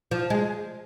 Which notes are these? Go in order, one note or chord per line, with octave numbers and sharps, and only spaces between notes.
F3
G#3